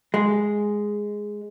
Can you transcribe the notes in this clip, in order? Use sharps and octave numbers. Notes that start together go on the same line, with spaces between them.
G#3